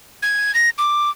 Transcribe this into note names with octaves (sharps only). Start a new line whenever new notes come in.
G#6
A#6
D6